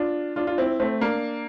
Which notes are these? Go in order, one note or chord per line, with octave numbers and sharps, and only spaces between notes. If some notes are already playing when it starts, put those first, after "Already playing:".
Already playing: D4 F4
D4 F4
F4
C4 E4
A3 C4
A#3 D4